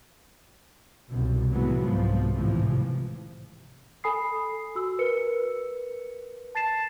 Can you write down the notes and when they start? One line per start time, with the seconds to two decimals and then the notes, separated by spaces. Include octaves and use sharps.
1.10 C2 F#2 B2
1.52 A2 E3 F#3 G#3 B3
1.83 C2 G#2 F3
2.31 G#1 A2 C3 E3 F3
4.04 A4 G#5 B5 D#6 C7
4.75 F#4 E6
4.99 A#4 B4 C#7
6.55 A5 A6 C7 E7